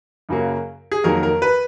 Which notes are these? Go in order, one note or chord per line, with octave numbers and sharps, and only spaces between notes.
F#2 C#3 F#3 A#3
G#4
F2 D#3 F#3 A#3 A#4
A#4
B4